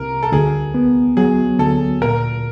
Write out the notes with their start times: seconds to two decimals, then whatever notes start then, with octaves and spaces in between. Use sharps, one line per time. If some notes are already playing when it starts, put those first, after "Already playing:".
Already playing: C2 C3 A#4
0.23 A4
0.32 D2 G#4
0.74 B3
1.17 F#3 G#4
1.59 D2 A4
2.01 A#2 A#4